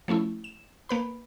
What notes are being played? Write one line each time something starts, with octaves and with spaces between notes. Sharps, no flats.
F3 A3 C#4 E4
E7
A#3 B4 B5